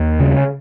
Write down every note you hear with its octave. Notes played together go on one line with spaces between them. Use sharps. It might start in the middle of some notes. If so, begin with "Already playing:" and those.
Already playing: D#2
C#3